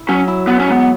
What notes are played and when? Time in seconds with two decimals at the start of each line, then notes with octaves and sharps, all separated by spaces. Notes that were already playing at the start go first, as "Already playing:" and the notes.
Already playing: E4
0.08 F#3 C#4
0.28 E4
0.47 F#3 B3
0.59 C#4
0.67 G#2 B3